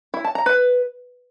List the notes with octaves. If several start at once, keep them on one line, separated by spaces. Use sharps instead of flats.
E4
A5
A#5
B4